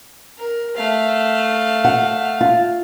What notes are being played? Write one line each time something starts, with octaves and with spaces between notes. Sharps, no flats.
A#4
A3 F5
F#5
F4